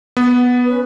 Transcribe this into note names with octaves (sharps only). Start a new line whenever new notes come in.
B3
C#4 B4